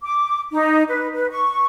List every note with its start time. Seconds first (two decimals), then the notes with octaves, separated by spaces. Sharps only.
0.03 D6
0.51 D#4
0.88 B4
1.13 B4
1.30 C#6